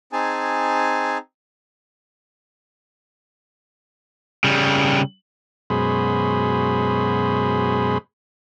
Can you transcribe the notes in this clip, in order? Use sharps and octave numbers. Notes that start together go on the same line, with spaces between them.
C4 D#4 G#4 G#5 A5
C#3 G3
F#2 B2 G#3 G#4 C5 B5